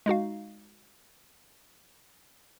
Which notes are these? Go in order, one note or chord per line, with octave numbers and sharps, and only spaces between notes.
G#3 D#4 F#4 F5